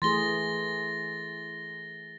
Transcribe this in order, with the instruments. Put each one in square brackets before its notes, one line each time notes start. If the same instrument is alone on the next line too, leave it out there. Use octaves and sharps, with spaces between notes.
[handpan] E3 A3 G#4 [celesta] C6 [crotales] A6 A#6 G7